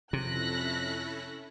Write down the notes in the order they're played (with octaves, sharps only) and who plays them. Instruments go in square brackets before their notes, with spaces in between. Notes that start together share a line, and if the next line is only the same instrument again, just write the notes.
[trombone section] F2 [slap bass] C3 [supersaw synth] C#4 E4 A4 [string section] F#6 A#6 B6